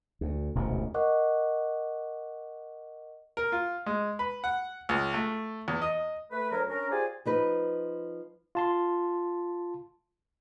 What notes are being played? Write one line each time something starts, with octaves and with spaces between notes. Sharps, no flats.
D2
E1 A1 D2 C3
A#4 D#5 F#5 C#6 D6 F#6
A#4
F4
G#3
B4
F#5
C#2
A3
E2
D#5
A3 B4
D2 F#3 A#4
C#4 D4 A#4
F4 G4 G#4 C5 D5 G#5
F3 D#4 B4
F4 A5 C6